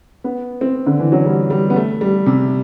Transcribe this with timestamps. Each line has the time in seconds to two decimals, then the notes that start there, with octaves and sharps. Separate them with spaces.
0.24 B3
0.61 C4
0.86 D3
0.99 E3
1.12 F#3
1.25 G3
1.50 G3
1.70 B3
1.76 A3
2.01 G3
2.26 C3